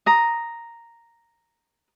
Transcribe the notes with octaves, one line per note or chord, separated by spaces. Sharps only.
A#5 D#6